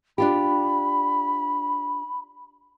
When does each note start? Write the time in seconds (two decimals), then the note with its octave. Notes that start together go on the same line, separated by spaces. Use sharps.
0.18 D4 F4 G4 B5